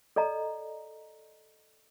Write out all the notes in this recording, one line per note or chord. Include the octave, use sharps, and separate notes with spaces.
A4 D5 D#5 A#5